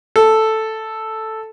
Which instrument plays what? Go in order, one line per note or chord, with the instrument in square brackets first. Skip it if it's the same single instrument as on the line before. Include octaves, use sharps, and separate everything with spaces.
[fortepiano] A4